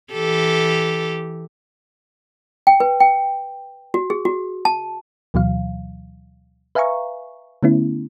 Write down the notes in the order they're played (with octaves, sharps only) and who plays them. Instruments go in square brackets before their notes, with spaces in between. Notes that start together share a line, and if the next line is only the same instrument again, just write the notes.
[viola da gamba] E3 G4 A4
[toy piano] G5
B4
G5
F#4
G#4
F#4
A5
[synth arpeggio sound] D2 B2 E3 F#3 F5
B4 E5 F5 G#5 A#5 C#6
D3 A3 B3 C#4 E4